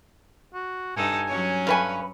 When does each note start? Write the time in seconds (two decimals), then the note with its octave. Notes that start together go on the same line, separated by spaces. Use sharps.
0.54 F#4
0.96 G2 D#4 A4 G#5
1.27 F#3 C#4 C#5
1.67 G2 B4 G#5